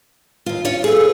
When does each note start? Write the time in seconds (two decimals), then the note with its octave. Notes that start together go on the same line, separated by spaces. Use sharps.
0.46 D#2 F4
0.65 C#4 F4 C#5
0.84 G#4 A4 B4